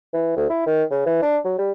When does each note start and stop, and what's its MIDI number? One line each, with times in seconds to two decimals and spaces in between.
0.13 0.32 52
0.37 0.45 38
0.50 0.65 64
0.66 0.83 51
0.91 1.03 49
1.06 1.21 52
1.22 1.37 62
1.45 1.55 54
1.58 1.71 55